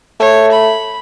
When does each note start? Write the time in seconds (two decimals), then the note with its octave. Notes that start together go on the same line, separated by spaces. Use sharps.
0.20 A3 C#5
0.51 B5